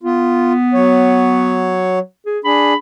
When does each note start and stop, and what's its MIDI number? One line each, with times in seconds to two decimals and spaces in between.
0.03 1.87 59
0.03 0.53 65
0.74 1.99 54
0.74 1.99 73
2.26 2.39 68
2.45 2.73 62
2.45 2.73 68
2.45 2.76 83